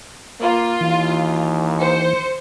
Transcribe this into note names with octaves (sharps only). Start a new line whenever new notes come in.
A#3 F4
D#2 E3
C5 C#7